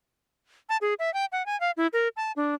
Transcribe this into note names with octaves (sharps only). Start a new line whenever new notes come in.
A5
G#4
E5
G5
F#5
G#5
F5
E4
A#4
A5
D4